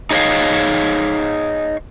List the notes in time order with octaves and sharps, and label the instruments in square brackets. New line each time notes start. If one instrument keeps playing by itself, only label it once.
[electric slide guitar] D#4 G#4 C#5 D#5 F5